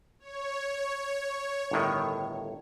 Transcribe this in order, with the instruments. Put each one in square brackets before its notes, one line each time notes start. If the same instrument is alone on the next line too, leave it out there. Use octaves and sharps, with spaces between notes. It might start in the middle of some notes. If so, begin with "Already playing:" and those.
[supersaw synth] C#5
[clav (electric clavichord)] G1 A2 D#3